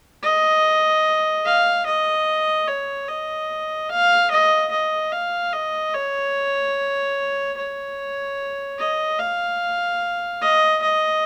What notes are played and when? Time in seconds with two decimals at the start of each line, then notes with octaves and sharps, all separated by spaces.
0.23 D#5
1.46 F5
1.86 D#5
2.68 C#5
3.08 D#5
3.89 F5
4.31 D#5
4.71 D#5
5.12 F5
5.53 D#5
5.94 C#5
7.57 C#5
8.78 D#5
9.19 F5
10.42 D#5
10.82 D#5